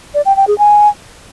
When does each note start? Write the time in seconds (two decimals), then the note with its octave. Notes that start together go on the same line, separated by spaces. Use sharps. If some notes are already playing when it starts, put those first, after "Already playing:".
0.14 D5
0.25 G5
0.36 G5
0.47 G#4
0.58 G#5